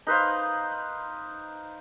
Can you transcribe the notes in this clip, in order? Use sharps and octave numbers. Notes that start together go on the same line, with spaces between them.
D#4 B4 C5 F5